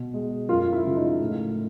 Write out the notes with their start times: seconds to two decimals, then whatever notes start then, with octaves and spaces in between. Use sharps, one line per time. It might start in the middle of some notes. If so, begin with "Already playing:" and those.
Already playing: B2
0.14 G#3
0.48 F#2 F4
0.73 E4
0.84 C#3 F3 G#3
0.96 D#4
1.20 A2